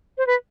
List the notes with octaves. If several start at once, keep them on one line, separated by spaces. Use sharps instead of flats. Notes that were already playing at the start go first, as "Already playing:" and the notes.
C5
B4